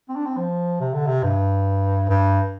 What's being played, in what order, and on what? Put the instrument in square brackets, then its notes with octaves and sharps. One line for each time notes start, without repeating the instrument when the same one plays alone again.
[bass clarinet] C4
D4
C4
F3
C3
D3
C3
G2
G2